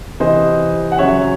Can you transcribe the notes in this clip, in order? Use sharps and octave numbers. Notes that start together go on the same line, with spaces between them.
C3 E3 C5 D#5
F#5
C#3 F#3 C#5 E5